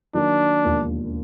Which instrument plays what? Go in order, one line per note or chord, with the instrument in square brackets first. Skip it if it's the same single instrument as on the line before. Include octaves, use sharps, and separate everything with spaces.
[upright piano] D#3 F#3 A#3 [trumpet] D4
[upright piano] E1 D#2 D3 F3 A#3